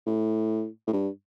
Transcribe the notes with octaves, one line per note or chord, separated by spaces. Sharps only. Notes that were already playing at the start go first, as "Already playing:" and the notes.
A2
A2
G2